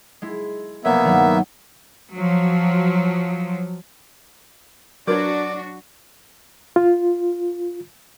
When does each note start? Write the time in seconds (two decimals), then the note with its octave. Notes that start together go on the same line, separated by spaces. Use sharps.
0.22 G#3 E4
0.85 F1 B1 A#3 B3 C#5 E5
1.04 G2 D#3 F#3
2.14 F3 F#3
5.07 F#3 D4 F#4 A#4 B4 C#5 D5
6.76 F4